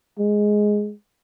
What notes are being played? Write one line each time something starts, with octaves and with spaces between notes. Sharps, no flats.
G#3